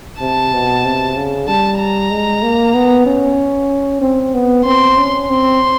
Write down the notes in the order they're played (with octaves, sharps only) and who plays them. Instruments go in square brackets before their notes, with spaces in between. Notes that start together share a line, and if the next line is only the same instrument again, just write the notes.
[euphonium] C3 [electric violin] A5
[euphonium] B2
C3
C#3
[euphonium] G3 [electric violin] A5
[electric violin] A#5
[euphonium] G#3
A#3
B3
C#4
C4
B3
[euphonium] C4 [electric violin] C6
[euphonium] C#4
[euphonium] C4 [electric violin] C6